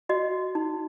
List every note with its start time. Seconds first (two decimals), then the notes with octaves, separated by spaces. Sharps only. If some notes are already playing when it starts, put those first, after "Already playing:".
0.09 F#4 D#5
0.55 D#4